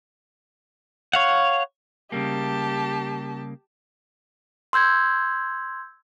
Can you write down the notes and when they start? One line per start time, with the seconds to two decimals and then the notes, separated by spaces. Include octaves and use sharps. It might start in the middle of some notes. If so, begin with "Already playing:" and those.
1.13 C#5 F5 F#5
2.12 C#3 G3 A#3 G4 A5
4.73 C6 E6 G6 G#6